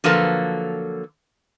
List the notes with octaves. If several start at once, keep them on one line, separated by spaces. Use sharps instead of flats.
D3 F3 F#3 A#3 A4 B4